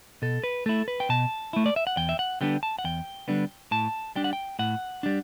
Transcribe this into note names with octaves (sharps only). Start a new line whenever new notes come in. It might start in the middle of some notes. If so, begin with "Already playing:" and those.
B2 A4
B4
A3 E4 A4
B4
G5
B2 A5
A3 E4
D5
E5
F#5
E2 G5
E5
F#5
D3 G3 B3 D4 G5
A5
F#5
E2 G5
D3 G3 B3 D4
A2 A5
G3 D4 G5
F#5
G5
A2 F#5
G3 D4